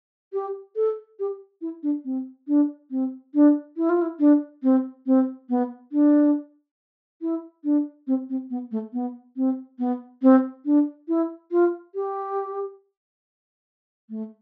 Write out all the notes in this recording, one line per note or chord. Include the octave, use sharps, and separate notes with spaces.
G4
A4
G4
E4
D4
C4
D4
C4
D4
E4
F4
E4
D4
C4
C4
B3
D4
E4
D4
C4
C4
B3
A3
B3
C4
B3
C4
D4
E4
F4
G4
A3